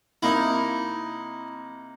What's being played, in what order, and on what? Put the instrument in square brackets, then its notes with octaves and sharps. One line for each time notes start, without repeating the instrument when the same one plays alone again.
[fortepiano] C3 A#3 D#4 [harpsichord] E4